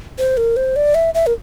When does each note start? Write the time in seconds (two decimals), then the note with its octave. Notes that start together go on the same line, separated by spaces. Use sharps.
0.18 C5
0.37 A#4
0.56 C5
0.76 D5
0.95 E5
1.14 E5
1.27 A#4